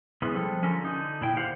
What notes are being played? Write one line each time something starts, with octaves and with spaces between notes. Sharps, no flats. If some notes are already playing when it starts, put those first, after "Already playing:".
E3 G#3 B3 C#4
F3 G3 A4
D3 C#4 F4 A4 A#4
D3 D#4
A#2 E4 G5
D3 D#3 G4 C5 F5 F#5